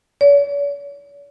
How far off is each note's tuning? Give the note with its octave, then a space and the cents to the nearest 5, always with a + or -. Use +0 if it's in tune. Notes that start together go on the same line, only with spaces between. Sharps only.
C#5 +45